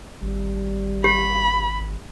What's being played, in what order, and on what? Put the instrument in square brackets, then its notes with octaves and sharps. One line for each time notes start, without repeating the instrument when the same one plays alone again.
[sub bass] G#1 [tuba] G3
[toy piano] G4 [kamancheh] B5